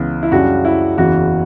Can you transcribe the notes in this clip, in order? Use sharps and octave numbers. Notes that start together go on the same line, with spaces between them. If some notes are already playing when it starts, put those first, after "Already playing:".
Already playing: C#2 C#3 E3 B3
E4
F#2 C#3 G3 D4 F#4
E4
F#1 E2 C#3 E3 F#4